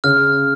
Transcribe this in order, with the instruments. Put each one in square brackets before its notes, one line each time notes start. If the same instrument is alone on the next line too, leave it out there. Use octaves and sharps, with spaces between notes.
[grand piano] C#3 [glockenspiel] F6